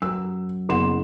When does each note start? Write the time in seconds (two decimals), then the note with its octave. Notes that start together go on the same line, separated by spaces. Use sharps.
0.02 F#2 E6
0.69 F#1 B3 F#5 C6 D6 E7